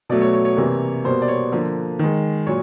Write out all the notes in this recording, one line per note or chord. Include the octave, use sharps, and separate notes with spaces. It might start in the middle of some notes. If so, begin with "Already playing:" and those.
B2 F#3 A3 D5
C#5
C#5
C#5
C3 E3 G3 A#3
B2 G3 A#3 C5
D5
C#5
D3 F3 A#3
D#3 G#3
A#2 F#3 C#5